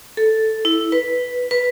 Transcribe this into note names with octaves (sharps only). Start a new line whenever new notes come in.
A4
E4
B4
B4